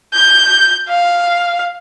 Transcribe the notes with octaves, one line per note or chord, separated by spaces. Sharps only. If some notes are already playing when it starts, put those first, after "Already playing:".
G6
F5